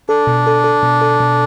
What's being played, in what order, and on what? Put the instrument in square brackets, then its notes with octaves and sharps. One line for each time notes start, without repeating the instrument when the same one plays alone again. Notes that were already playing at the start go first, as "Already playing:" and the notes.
[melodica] D4 [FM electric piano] A4
[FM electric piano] B2
A4
A4
B2
A4
B2